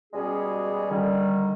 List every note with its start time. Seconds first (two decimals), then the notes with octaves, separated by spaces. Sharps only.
0.14 B2 G3 G#3 C#4 F#4 G#4
0.90 D3 D#3 G3